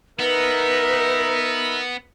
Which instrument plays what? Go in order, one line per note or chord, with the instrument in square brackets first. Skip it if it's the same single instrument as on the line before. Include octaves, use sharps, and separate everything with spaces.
[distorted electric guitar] B3 [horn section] D#4 A#4 E5 [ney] B4